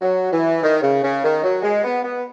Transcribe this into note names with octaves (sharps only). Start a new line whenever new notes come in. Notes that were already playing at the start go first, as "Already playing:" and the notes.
F#3
E3
D#3
C#3
C#3
D#3
F#3
G#3
B3
B3